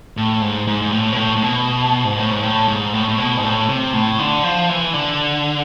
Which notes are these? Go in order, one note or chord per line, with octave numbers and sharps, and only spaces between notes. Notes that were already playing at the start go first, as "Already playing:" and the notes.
A2
G#2
G#2
G#2
A2
B2
A2
A2
B2
G#2
A2
G#2
A2
G#2
A2
A2
B2
G#2
A2
C3
A2
D3
F3
E3
D3